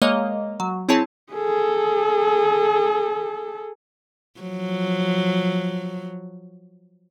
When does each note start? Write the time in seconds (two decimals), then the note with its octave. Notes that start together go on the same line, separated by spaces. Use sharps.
0.02 G#3 A#3 C#5 D#5 F5
0.60 F#3
0.89 C4 E4 G#4 C#5 A5
1.33 G#4 A4
4.40 F3 F#3